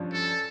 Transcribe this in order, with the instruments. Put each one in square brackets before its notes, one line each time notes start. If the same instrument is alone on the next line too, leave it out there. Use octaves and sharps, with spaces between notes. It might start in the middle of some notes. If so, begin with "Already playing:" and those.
Already playing: [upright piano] G2 F3 C#4
[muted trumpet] A4